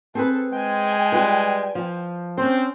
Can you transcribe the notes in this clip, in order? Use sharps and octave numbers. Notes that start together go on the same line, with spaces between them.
C4 G#4 A4 B4
G#3 G5 G#5
G3 F4 B4
F3
C4 C#4 C5